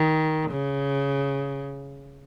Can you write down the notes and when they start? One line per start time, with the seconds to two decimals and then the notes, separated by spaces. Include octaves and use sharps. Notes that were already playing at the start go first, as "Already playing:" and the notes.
Already playing: D#3
0.51 C#3